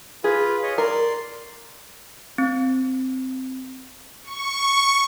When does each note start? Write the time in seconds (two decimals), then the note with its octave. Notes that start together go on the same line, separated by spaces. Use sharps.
0.24 F4 G#4 B4
0.63 C#5 D#5
0.78 A#4 D5 C6
2.38 C4
4.24 C#6